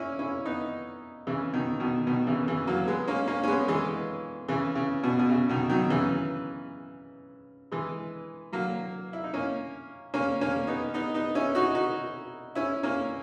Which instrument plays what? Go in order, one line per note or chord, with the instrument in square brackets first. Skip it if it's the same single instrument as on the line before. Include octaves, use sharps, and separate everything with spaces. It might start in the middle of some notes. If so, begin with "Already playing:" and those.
Already playing: [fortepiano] A#3 C#4 E4
C#4 E4
B3 D#4
C#3 E3
B2 D#3
B2 D#3
B2 D#3
C#3 E3
C#3 E3
F#3 A#3
G#3 B3
A#3 C#4
A#3 C#4
C#4
G#3 B3
E3 G#3
C#3 E3
C#3
B2
B2
C#3
B2 D#3
D#3 F#3
C#3 E3
E3 G#3
F#3 A#3
E4
D#4
A#3 C#4
A#3 C#4
A#3 C#4
B3 D#4
B3 D#4
B3 D#4
C#4 E4
D#4 F#4
D#4 F#4
C#4 E4
A#3 C#4